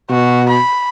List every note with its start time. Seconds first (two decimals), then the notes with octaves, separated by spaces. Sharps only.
0.10 B2 F#4
0.49 B5